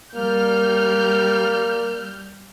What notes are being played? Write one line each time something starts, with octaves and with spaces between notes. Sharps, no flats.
G3 A#3 F6 G6